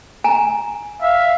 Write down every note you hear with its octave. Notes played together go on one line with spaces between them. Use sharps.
G#5 A#5
E5 F5